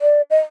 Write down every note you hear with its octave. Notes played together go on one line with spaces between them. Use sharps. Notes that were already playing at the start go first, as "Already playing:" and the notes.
D5
D#5